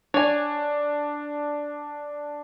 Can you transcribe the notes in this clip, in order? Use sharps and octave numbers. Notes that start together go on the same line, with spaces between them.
D4 C#5 G#5